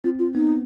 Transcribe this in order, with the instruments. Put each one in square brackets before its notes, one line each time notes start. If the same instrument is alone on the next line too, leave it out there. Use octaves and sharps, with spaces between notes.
[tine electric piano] C4 [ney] F4
[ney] F4
[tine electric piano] B3 [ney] D#4